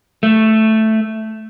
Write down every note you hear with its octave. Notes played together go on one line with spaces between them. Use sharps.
A3